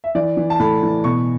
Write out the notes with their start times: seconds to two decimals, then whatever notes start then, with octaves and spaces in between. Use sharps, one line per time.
0.04 E5
0.15 E3 D5
0.37 E3
0.50 A5
0.60 A2 B5
0.83 E3
1.04 B2 C#6